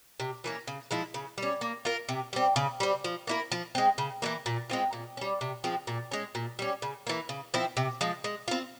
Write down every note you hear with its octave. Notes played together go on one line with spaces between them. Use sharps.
C3
E3 A#3 C#4
C#3
F3 G#3 E4
C#3
G3 C#4
A#3
F4 A#4
C3
G3 C4
C#3
G3 C4
F3
A#3 E4 A#4
F3
G#3 C4
C#3
E3 G3 A#3
A#2
G#3 C4 F4
A#2
G3 C#4
C3
F3 G#3 C4
A#2
G#3 C#4
A#2
G3 C#4
C#3
E3 A#3
C#3
F3 C4 E4
C3
F3 G#3
G#3
C4 F4